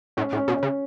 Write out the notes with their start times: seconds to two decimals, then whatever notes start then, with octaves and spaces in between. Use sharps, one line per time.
0.17 A2 C#4
0.33 A2
0.37 C#4
0.48 B2
0.57 C#4
0.63 C#3